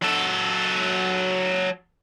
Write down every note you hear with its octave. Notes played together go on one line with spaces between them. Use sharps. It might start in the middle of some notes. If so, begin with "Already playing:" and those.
F#3 A4